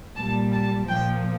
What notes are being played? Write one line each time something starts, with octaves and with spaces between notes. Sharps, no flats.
A#2 G3 A5
A5
A#2 F3 G5